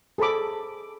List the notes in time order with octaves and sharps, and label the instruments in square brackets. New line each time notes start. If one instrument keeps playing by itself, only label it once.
[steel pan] G#4 A4 C5 B5 D6